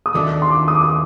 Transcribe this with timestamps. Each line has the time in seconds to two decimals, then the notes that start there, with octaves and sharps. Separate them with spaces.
0.06 D#6
0.14 D#2 D#3 A3 D4 F#4 D6
0.42 C6
0.50 D6
0.68 D#6
0.76 D6
0.83 D#6